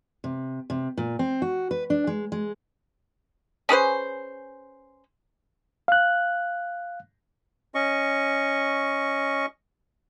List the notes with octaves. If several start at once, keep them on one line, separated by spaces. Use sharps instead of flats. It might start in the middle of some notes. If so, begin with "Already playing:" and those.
C3
C3
A#2
C4
F#4
B4
D4
G#3
G#3
C#4 G#4 B4 C5
F5 F#6
C#4 D#5 C#6